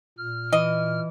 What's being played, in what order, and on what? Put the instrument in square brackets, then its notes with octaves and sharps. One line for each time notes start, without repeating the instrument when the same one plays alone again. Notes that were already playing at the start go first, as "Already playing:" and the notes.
[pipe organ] A#2 F6
[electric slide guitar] E3 [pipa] D#5